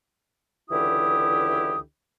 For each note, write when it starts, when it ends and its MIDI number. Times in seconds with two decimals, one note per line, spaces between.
0.70 1.80 37
0.70 1.80 50
0.70 1.80 52
0.70 1.80 64
0.70 1.80 67
0.70 1.80 87